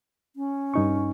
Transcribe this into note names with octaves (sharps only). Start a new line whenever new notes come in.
C#4
G2 D#4 C#6